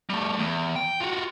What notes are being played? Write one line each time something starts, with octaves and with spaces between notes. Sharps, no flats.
G3 A3
E2
G5
F4 F#4